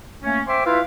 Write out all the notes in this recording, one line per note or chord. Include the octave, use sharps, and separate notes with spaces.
A3 A#3 C#4
C5 E5 G5 C6 D6
E4 F4 B4 E5 F5